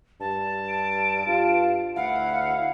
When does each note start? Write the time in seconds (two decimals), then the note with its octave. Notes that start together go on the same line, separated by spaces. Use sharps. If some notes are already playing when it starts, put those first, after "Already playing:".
0.20 G2 A5
0.69 D7
1.27 G2 F4
1.96 D2 E4 F5 F#5